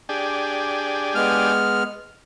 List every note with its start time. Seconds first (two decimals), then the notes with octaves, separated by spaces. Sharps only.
0.09 D4 G4 G#4
1.15 G#3 B3 F6